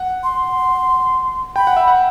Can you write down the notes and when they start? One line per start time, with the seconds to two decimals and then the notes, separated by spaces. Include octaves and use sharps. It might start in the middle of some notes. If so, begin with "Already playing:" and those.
Already playing: F#5
0.24 C6
1.56 G5 B5
1.67 F#5
1.77 E5
1.88 F#5